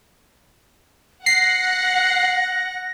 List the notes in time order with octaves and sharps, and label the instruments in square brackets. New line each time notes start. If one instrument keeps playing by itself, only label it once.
[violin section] F#5 [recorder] A#6 [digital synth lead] C7